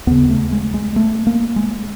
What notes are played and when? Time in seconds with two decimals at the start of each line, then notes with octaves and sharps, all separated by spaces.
0.07 D#2 C#3 B3
0.30 A3
0.52 G#3
0.74 G#3
0.96 A3
1.27 A#3
1.56 G#3